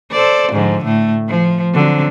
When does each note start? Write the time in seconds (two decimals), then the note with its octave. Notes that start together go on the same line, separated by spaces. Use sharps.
0.11 A4 C5 D5
0.52 G#2 D3 F3
0.84 A2 A3
1.28 F3
1.74 D3 F#3 C4